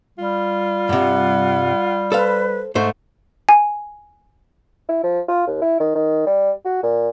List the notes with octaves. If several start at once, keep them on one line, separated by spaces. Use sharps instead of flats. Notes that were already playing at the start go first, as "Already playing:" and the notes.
G3 F4
G2 C3 F#5
A4 B4 C5 F5
G#2 A3 C5 C#6
G#5
E4
F3
F4
D#2
E4
D#3
D#3
G3
F#4
A#2